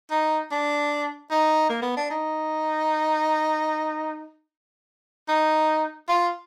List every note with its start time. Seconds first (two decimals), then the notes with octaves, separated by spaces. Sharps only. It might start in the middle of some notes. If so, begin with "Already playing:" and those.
0.11 D#4
0.51 D4
1.30 D#4
1.69 A#3
1.82 B3
1.96 D4
2.10 D#4
5.28 D#4
6.08 F4